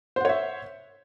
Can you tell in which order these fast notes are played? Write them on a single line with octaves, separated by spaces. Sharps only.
C5 F#5 C#5 E5